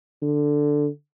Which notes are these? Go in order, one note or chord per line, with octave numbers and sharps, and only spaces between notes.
D3